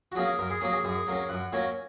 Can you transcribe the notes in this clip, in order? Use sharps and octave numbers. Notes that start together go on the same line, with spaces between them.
F#4
F#3 A#3 C#4 G#4
F#2 A#4
G#4
F#3 A#3 C#4 G#4
G#4
F#2 G#4
F#3 A#3 C#4
F#2 F#5
F#3 A#3 C#4 G#5